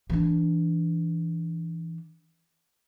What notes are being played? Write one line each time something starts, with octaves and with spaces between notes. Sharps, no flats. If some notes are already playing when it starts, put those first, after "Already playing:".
E3 D4